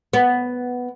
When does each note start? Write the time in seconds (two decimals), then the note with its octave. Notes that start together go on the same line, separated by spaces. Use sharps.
0.13 B3